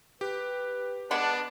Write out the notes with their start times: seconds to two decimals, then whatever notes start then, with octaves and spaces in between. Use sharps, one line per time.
0.21 G4 B4
1.11 G#3 B3 D4 F#5 A5 B5